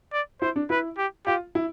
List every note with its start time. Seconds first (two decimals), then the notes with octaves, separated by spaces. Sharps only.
0.13 D5
0.41 E4 C5
0.56 D4
0.70 E4 B4
0.98 G4
1.26 F4 G4
1.55 E4